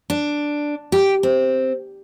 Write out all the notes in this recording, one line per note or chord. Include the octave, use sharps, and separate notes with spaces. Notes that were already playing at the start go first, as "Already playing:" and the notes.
D4
G4
C4